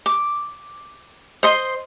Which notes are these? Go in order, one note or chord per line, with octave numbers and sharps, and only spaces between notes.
D6
C5 D#5 C6